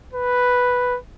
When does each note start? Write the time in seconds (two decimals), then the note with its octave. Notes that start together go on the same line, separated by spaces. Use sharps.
0.13 B4